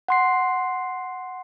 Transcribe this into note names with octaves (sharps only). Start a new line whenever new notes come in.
F#5 C6 C7